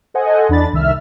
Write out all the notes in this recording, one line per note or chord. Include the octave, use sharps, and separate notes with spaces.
A4 C5 D#5 F#5 G#5
E2 D4 B5 A6
C2 D#3 E5 E6 F6